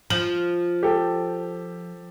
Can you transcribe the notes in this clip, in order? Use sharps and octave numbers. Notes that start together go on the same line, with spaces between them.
F3 F#7
G4 A4